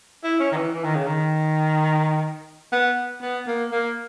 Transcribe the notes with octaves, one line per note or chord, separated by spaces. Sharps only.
E4
C#4
D#3
E3
E3
D#3
C#3
D#3
B3
B3
A#3
A#3